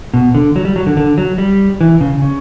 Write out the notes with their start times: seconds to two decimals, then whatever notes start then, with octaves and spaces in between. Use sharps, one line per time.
0.14 B2
0.35 D3
0.56 F#3
0.65 G3
0.76 F#3
0.87 D3
0.97 D3
1.18 F#3
1.38 G3
1.81 E3
2.01 C#3
2.22 C#3